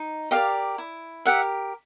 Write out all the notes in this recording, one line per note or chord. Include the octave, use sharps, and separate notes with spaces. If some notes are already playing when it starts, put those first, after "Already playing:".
Already playing: D#4
G4 A#4 D5 D#5 F5
E4
G4 A#4 E5 F#5